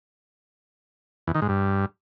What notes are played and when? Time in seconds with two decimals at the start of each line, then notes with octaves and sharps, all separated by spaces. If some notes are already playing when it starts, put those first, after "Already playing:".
1.27 E2
1.35 D#3
1.42 G#2
1.49 G2